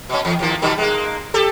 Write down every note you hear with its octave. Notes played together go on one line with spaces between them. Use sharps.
B2 C#4
E2
D#2 F3 A#3
B2 D#3 G3
G#3 A#3
G4 A4